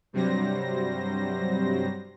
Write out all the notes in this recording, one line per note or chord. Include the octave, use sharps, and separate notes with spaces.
G2 C3 F#3 G3 C5 A#6